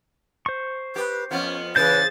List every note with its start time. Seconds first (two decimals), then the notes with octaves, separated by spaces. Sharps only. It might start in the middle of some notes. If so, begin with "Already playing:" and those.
0.46 C5 C#6
0.96 G4 B4
1.31 F2 B3 C#4 F4
1.76 C#3 E3 G#4 B4 C5 G6 A6